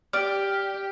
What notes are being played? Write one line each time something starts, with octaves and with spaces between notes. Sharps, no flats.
G4 D5 F6